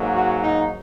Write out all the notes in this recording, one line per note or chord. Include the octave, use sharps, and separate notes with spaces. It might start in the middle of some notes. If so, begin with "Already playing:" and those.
Already playing: G#2 F#3 A#3
F#4
D#4